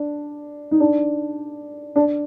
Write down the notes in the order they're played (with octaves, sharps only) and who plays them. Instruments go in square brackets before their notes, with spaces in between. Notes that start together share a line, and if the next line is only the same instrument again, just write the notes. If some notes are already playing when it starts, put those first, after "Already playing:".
Already playing: [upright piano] D4
D#4
D4
D4